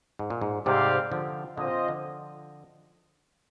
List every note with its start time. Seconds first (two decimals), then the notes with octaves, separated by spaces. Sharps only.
0.19 G#2
0.30 A#2
0.41 G#2
0.66 G#2 C3 G3 C4 G4 D5 F5
1.12 D3 F3
1.57 A#2 D3 C4 F4 C5 D#5
1.88 D3 F3